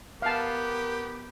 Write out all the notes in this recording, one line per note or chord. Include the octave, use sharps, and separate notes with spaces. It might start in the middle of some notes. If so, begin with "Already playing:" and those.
B3 G4 A#4 F5 A5